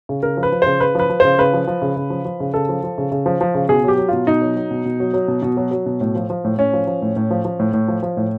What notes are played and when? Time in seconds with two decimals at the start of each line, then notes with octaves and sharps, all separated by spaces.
0.09 C#3
0.23 C#3 A#4
0.37 F3
0.43 B4
0.52 F3
0.62 C#3 C5
0.80 C#3 B4
0.95 F3 B4
1.09 F3
1.20 C#3 C5
1.38 C#3 B4
1.53 F3
1.67 F3
1.82 C#3
1.96 C#3
2.10 F3
2.25 F3
2.40 C#3
2.54 C#3 A4
2.69 F3
2.84 F3
2.98 C#3
3.12 C#3
3.26 F3
3.41 F3
3.55 C#3
3.69 B2 G#4
3.84 F#3 G4
3.98 F#3
4.08 B2 F4
4.27 B2 D#4
4.42 F#3
4.57 F#3
4.71 B2
4.85 B2
5.00 F#3
5.13 F#3
5.28 B2
5.42 B2
5.57 F#3
5.71 F#3
5.86 B2
6.01 A2
6.15 F3
6.30 F3
6.45 A2
6.58 A2 C#4
6.73 F3
6.87 F3
7.02 A2
7.16 A2
7.31 F3
7.45 F3
7.60 A2
7.74 A2
7.88 F3
8.03 F3
8.17 A2